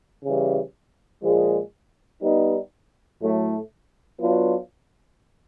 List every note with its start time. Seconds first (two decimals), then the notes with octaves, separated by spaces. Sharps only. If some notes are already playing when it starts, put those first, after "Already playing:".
0.24 C#3 E3 G3
1.24 A#2 F3 G#3
2.22 G3 B3 D#4
3.22 A2 F#3 A3
4.20 F#3 B3 D4 F4